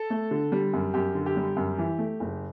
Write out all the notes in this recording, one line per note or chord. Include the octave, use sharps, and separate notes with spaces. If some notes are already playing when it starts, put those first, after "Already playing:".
Already playing: A4
A3
D3
G3
F#2
F#2 G4
D3
G4
G3
F#2
E3
A3
F#1